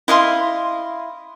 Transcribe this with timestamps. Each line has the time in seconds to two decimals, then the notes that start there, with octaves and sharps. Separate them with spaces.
0.08 E4 D#5 F5 C6